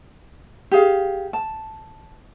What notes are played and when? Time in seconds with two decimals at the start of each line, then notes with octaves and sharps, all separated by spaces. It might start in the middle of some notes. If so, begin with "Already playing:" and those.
0.72 G4 G#4 F5
1.33 A5